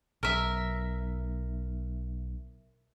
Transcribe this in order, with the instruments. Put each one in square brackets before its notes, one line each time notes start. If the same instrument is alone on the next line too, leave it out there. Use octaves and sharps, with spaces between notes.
[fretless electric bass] B1 [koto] A#4 E5